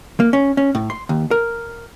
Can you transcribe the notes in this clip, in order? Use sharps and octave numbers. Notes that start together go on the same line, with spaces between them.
A#3
C#4
C#4
A2
C6
D#2
A#4